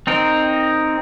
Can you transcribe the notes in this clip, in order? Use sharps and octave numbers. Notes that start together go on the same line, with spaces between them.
C4 D#4 A#4